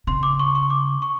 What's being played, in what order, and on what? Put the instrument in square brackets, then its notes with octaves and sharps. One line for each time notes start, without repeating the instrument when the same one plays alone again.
[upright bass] C#3 [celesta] C6
[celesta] D6
C#6
C#6
D6
C#6